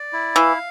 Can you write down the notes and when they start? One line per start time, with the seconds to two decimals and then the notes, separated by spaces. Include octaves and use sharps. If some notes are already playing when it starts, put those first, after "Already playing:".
Already playing: D5
0.13 E4
0.35 E3 F5